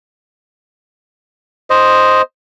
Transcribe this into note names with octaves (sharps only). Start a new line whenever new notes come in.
C5 D#5